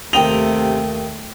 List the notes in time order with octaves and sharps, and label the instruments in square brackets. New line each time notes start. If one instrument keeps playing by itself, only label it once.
[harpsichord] D#2 D#5 [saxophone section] C3 [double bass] A3 [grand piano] G5 F7